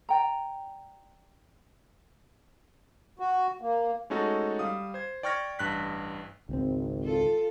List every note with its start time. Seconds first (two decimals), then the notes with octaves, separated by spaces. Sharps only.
0.09 D5 G5 A#5
3.19 F#4
3.62 A#3
4.10 G#3 A3 C#4 D#4 F#4 A4
4.59 G3 F5 D#6
4.94 C5 G#6
5.23 D5 G5 C#6 F6 G#6 A#6
5.59 A1 G2 F#6 B6
6.49 G#1 C#2 C4
7.04 F4 A4